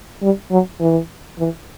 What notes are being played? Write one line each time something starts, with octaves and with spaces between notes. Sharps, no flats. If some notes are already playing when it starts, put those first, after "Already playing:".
G3
F#3
E3
E3